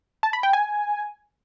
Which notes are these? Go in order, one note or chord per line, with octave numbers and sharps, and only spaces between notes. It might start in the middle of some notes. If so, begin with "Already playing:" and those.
A5
B5
G5
G#5